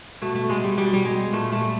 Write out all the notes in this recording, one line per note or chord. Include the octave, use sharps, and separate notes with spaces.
B2 A3
A3
G3 G#3
G3
B2 G3
G3
G3 G#3
A#2 A3
A3
G3